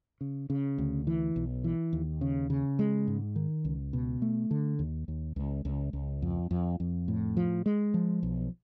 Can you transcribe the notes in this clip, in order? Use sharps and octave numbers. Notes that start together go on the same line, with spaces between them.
C#3
C#3
D2
E3
B1
E3
D#2
C#3
C#3
G#3
G#2
D#3
C#2
B2
A3
D3
D#2
D#2
C#2
C#2
C#2
F2
F2
F2
A2
F3
G#3
F3
B1